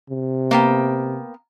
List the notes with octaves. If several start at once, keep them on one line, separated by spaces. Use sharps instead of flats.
C3
A#3 B3 G5